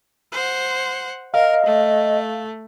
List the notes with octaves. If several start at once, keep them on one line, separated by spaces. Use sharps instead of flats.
C5 F#5
A#4 D#5 F5
A3